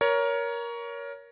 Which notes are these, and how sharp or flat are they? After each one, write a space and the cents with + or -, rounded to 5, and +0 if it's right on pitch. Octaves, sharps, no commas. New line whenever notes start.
A#4 +15 C#5 +20